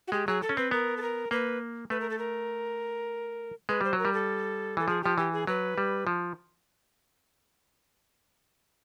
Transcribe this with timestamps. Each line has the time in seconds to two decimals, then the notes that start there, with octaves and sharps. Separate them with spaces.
0.07 F#4
0.12 G#3 G4
0.27 F#3 G#4
0.42 A4
0.49 C#4
0.57 C4 B4
0.71 B3 A#4
0.97 A4
1.02 A#4
1.31 A#3 B4
1.90 A3 B4
2.00 A#4
2.10 A4
2.19 A#4
3.69 G#3 B4
3.81 G3 C5
3.93 F#3
3.99 A#4
4.05 G3
4.14 A4
4.77 E3 A4
4.88 F3 G#4
5.03 F3 G4
5.18 E3 G4
5.33 G#4
5.47 F#3 B4
5.78 G3
6.07 F3